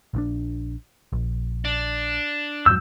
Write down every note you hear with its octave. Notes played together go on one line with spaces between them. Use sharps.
A#1 D#3 D4
A#1
D4
F2 G#2 F#3 E6 G6